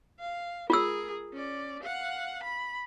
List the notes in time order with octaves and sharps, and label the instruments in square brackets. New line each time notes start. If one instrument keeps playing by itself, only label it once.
[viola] F5
[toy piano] F4 E6 [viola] G#4 A#4
[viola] C#4 D5
F5 F#5
B5